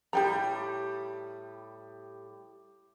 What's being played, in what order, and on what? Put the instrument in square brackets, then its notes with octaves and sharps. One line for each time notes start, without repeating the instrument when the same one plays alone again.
[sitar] A2 G3 [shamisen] G4 G5 A#5